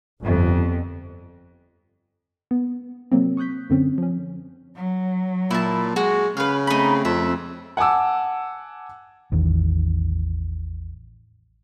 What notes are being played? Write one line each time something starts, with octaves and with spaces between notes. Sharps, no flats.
G1 F2
B3
C3 F#3 A#3 C4
C#6 D#6 F#6 G6 B6
F#2 D3 C4 C#4
F3 C#4
F#3
A#2 E4 A5
G#3 F#4
C#3 B4 F5
A3 C4 D#4 B5
F2 E5
F#5 G#5 A5 D6 E6
A1 E2 D#3